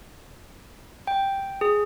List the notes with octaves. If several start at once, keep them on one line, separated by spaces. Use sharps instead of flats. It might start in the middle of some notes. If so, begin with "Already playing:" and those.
G5
G#4